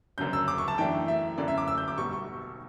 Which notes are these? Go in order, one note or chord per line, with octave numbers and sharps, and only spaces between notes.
F#1 F#2 D3 F#3 C#4 G6
E6
D6
C#6
A5
F#2 E3 A3 D4 G5
E5
F#2 D3 A3 C#4 E4 D5
E5
D6
E6
G6
D6
B1 B2 G3 C#6
C#6